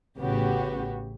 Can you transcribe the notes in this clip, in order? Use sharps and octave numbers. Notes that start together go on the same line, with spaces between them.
A1 C#3 B3 F#4 G4